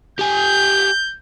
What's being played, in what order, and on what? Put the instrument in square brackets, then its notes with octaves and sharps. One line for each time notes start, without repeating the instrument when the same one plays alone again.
[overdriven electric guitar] G4 G#5 [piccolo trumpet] G6